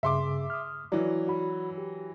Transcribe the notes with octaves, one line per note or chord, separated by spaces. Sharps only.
G2 C#3 G#4 E5 C6 D6
D#6 F6
E3 F#3 D5
F#4 B5
G4